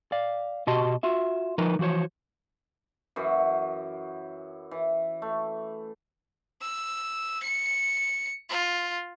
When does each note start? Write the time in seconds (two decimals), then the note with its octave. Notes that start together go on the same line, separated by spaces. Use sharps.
0.12 D5 F5
0.67 B2 F#4 G4 D#5 A5 C6
1.03 F4 F#4 E5
1.58 F3 D#4 A#4 B4
1.79 E3 F3 F#4 C5 C#5
3.16 F#2 E3 F#4
4.71 E3
5.22 A3
6.62 E6
7.43 C#7
8.49 F4